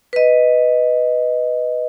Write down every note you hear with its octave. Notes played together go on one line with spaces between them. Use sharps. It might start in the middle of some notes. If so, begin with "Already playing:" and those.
B4 D#5